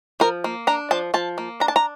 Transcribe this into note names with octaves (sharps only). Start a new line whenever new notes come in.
F3 A#4
A#3
D4 A#5
F3 A5
F3 A5
A#3
D4 A#5
A5
A#5